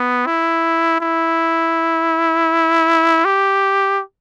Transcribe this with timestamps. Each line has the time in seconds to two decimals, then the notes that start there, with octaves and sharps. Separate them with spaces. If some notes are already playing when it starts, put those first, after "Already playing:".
Already playing: B3
0.27 E4
1.01 E4
3.25 G4